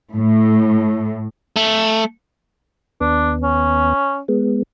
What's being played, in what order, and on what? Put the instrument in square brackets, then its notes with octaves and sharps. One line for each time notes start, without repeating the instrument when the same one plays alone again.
[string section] A2
[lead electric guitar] A3
[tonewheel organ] D#2 B3 [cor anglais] D4
[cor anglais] C#4
[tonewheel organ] G#3 B3